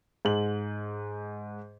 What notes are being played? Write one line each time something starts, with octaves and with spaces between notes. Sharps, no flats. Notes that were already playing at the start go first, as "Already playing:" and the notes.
G#2 F#7